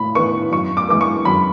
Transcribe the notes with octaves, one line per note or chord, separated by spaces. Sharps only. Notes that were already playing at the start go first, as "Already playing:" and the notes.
Already playing: A2 B5
E3 B3 C#6
F#2 C#6
D6
E3 G#3 B3 D6
C#6
F#2 B5